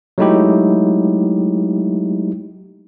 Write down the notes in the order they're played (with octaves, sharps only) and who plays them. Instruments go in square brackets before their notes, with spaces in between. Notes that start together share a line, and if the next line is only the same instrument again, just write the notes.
[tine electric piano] F#3 G#3 A3 D#4 E4 G4